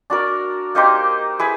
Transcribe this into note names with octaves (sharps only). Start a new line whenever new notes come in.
D4 F#4 A#4 D5
A#3 D#4 G4 C5
E4 G#4 B4